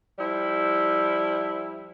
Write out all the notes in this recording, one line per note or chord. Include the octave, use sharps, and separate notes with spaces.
F3 G3 E4